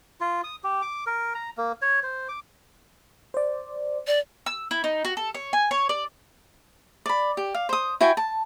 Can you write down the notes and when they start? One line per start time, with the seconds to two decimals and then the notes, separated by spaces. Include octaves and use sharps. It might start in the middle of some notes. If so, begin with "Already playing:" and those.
0.21 F4
0.44 D#6
0.64 G4
0.82 D6
1.07 A#4
1.35 A#5
1.57 A#3
1.82 C#5
2.03 C5
2.29 D6
3.34 C5 D5
4.07 D5
4.46 E6
4.71 E4
4.84 D#4
5.05 F#4
5.17 A4
5.35 C#5
5.53 G#5
5.71 C#5
5.89 D5
7.06 D5 B5
7.37 G4
7.54 F5
7.69 C5 D#6
8.01 E4 F#4 G5 G#5
8.17 A5